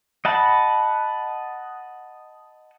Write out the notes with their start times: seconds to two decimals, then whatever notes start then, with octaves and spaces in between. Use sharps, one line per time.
0.25 D#5 F#5 A5 B5